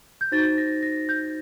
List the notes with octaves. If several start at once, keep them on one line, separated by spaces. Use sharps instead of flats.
G6
D#4 F#4 C5 A6
A#6
A#6
G6